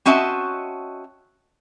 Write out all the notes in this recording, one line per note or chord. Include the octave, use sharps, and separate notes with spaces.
C4 C#4 F#4 D#5 E5 A5